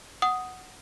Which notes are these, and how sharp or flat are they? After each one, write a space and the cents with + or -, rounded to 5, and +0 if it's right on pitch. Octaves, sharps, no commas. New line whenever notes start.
F#5 +0 D#6 +0